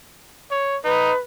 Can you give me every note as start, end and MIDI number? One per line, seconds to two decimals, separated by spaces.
0.51 0.77 73
0.84 1.12 63
0.84 1.17 71